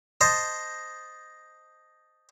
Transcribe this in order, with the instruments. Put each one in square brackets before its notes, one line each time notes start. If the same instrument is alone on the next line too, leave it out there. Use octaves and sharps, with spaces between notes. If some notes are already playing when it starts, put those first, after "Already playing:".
[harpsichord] C5 D#5 A5